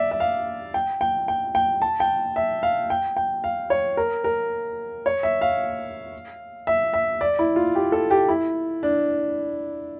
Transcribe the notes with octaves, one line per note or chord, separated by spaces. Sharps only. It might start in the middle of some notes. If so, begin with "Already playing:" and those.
Already playing: D5 E5
E5
F5
G5
G5
G5
G5
A5
G5
E5
F5
G5
G5
F5
C#5
A#4
A#4
C#5
E5
F5
E5
E5
D5
E4
F4
G4
A4
G4
E4
D4